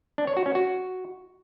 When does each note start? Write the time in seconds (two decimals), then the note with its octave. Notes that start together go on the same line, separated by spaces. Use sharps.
0.18 D4
0.27 C#5
0.37 F#4
0.46 C#4
0.55 F#4